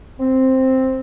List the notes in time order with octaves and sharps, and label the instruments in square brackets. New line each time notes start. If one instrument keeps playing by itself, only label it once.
[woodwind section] C4